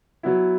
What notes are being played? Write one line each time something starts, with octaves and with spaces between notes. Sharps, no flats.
F#3 B3 E4